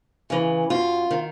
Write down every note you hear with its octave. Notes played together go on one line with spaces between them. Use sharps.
C#3 E3
F#2 F4
D#3